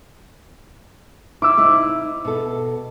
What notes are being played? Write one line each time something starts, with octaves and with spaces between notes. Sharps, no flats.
E4 D6 E6
C3 D#4 E4
B2 A4